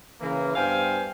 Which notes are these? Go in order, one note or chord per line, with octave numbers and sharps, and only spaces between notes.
C#3 E3 A#3
G2 B3 C5 F5 G5 G#5